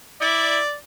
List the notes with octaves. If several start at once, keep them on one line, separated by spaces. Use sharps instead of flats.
E4 D5